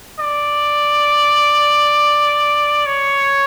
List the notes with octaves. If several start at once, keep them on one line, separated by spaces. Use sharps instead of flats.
D5
C#5